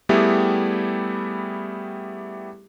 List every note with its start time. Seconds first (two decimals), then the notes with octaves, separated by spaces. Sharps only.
0.09 G3 A3 B3 E4 G4 G#4